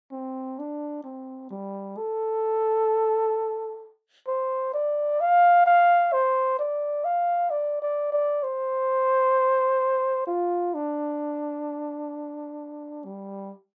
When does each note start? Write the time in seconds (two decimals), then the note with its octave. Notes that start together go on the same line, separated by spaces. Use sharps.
0.12 C4
0.59 D4
1.04 C4
1.51 G3
1.97 A4
4.28 C5
4.74 D5
5.21 F5
5.66 F5
6.13 C5
6.59 D5
7.05 F5
7.51 D5
7.82 D5
8.13 D5
8.43 C5
10.27 F4
10.75 D4
13.05 G3